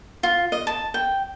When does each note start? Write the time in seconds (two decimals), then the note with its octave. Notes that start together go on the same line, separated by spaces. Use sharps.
0.23 F4
0.52 D#5
0.67 A5
0.94 G5